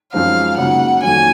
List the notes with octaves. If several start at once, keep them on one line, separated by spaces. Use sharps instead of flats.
F#2 F3 G#3 C4 D#4 F5
F#2 C#3 F#3 A#3 D#4 F#5
F2 D#3 F#3 A#3 C#4 G#5